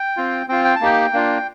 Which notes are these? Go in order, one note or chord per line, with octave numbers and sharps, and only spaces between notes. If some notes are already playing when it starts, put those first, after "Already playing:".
Already playing: G5
C4 F4
C4 F4 G5
G5
A5
A#3 D#4 G4 G5
A#3 D4 F4